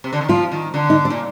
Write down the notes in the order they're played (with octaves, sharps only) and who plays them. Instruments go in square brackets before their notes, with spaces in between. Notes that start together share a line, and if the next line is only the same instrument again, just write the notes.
[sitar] C3
D3
D#3
[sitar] F3 [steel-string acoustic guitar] F4
[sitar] D#3
D3
[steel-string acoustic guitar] D#4
D4
[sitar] A#2